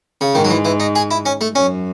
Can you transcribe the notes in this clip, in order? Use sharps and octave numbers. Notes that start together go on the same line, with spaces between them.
C#3
G#2 D#3
F#3
E3
E3
D#4
G#4
E4
C#4
A3
F#2 C#4